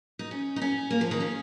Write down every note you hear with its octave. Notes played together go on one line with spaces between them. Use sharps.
D#4
C#4
D#4
C#4
A#3
F3
D#3
C#4